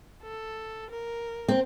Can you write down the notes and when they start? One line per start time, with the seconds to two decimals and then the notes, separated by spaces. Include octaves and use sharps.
0.22 A4
0.90 A#4
1.48 C4